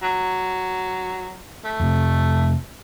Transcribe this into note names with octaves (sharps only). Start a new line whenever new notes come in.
F#3
A3
F2 C3